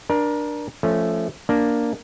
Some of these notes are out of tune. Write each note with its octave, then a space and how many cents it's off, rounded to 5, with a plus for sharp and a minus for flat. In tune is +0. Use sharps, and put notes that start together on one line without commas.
D4 +10 A#4 +30
F3 -15 A3 +0 C#4 +0
A#3 +0 D4 +0